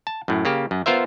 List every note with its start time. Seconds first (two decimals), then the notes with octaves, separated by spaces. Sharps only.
0.07 A5
0.28 F#2 A2
0.45 C#3 A#3 G4
0.71 F#2
0.86 B3 F4 A#4 C5 E5